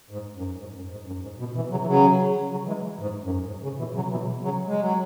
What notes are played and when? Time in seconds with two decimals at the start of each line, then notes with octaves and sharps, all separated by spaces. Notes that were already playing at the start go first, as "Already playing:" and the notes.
0.11 G#2
0.36 F#2
0.59 G#2
0.76 F#2
0.91 G#2
1.07 F#2
1.23 G#2
1.39 B2
1.55 B2 E3
1.71 C#3 F#3
1.81 E3
1.87 C#3 F#3
2.51 C#3 F#3
2.67 E3 G#3
3.00 G#2
3.23 F#2
3.47 G#2
3.63 C#3
3.78 B2 E3
3.94 C#3 F#3
4.11 B2 E3
4.42 C#3 F#3
4.67 G#3
4.80 F#3